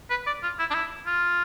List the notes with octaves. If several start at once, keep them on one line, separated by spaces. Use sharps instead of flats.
B4
D5
F4
E4
D4
E4
F4